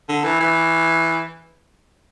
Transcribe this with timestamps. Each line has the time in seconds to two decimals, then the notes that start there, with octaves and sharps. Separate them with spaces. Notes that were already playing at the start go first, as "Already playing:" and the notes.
0.09 D3
0.24 E3
0.40 E3